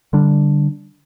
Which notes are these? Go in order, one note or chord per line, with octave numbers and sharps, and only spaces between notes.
D3 G3 D4